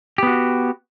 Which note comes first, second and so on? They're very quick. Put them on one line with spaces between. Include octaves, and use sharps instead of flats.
G4 B3 F#4